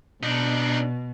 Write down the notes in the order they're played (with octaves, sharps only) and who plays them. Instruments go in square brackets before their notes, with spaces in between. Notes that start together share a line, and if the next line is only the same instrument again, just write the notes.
[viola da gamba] B2 [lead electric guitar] D4 D#4